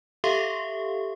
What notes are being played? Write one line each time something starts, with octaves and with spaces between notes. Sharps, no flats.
G4 A4 E5 F5 C6 C#6